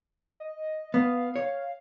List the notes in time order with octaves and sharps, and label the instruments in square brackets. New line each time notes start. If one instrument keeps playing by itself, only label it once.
[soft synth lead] D#5
[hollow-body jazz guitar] B3 [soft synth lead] F5
[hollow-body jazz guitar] C#5